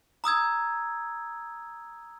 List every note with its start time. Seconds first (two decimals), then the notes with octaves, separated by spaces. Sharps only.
0.24 A#5 D#6 E6 G#6